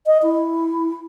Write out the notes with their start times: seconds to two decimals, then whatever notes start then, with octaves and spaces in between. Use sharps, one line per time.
0.06 D#5
0.23 E4